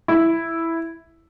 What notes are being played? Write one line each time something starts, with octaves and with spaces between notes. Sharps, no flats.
E4